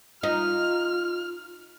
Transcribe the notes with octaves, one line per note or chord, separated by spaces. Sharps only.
D#4 F4 F6